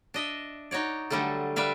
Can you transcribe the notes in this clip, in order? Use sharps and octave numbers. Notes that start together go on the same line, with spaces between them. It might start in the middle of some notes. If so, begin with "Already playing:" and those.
D4 D#5 E5
D#4 F#4 C#5 D5
D3 F#3 G3 A3 A4
G3 B4 D5 E5 F5